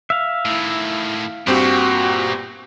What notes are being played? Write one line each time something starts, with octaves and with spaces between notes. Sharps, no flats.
E5 F5
A2 D#3 E4
G2 A#2 C4 F#4 G4